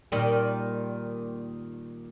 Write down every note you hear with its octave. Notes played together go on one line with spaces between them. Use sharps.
A#2 D#3 G3